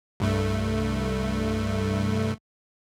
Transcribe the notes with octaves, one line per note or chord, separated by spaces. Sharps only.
C2 G2 A3